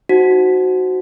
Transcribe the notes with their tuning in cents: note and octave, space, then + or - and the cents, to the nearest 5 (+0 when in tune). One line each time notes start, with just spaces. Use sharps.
D#4 +0 F#4 +0 C5 +0